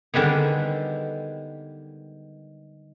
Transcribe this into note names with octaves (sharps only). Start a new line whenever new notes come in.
D3 D#3 G3 G#3 B3